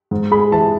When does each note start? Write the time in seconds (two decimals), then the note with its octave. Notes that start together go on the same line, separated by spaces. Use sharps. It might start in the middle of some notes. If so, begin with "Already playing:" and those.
0.11 G#2
0.31 G#3 B5
0.52 E3 A5